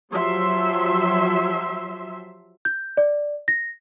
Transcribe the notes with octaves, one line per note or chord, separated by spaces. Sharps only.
F3 F#3 G4 E5 C6
G6
D5
A#6